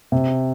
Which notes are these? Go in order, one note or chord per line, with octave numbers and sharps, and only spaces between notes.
C3